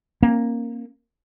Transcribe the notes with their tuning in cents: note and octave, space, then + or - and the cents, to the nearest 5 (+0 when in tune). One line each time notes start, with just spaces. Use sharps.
A#3 +0 C#4 -40